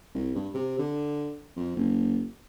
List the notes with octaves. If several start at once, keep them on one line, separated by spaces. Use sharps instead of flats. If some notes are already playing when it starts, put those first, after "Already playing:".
C2
G2
C3
D3
F2
F#1